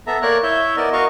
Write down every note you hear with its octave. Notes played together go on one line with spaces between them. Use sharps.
B3 A4 E5 A#5
A#3 A#4 C#5 D5 A#5 F#6
E4 C#5 E5 G6
B3 E4 A#4 D5 D#5
F#4 A#4 D#5 F5 C#6